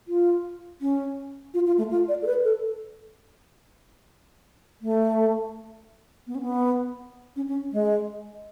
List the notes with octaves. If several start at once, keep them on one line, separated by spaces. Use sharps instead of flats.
F4
C#4
F4
F4
A3
F4
D5
A4
B4
A4
A3
B3
C#4
B3
C#4
C#4
G#3